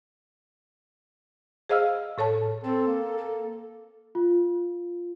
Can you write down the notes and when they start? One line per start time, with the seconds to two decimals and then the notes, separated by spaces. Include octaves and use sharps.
1.69 G#4 C5 D#5 F5 E6 F6
2.18 A2 A4 C#5 A5
2.64 C4 A4
2.87 A#3
3.18 A4
4.15 F4